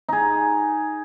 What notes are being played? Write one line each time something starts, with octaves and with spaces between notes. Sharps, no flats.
D#4 G#4